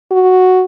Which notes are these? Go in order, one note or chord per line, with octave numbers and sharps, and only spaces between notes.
F#4